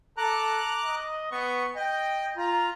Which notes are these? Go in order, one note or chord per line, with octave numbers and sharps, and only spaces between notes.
A4 A#5 D6 F#6
D#5
B3 C#6
D#5 G5
F4 A#5